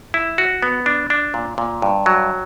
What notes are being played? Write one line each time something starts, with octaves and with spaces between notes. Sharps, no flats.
E4
F#4
B3
D4
D4
A#2
A#2
G2
F#3